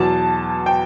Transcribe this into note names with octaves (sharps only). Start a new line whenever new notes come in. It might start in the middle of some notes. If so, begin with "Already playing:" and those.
Already playing: E2 B2 F#3 A5
G5